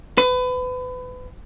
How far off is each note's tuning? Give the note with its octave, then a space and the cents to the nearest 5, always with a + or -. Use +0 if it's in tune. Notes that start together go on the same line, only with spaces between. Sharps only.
B4 +30